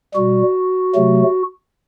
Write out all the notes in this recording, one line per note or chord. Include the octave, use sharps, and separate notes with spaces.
B2 G3 F#4
C3 F#3 A3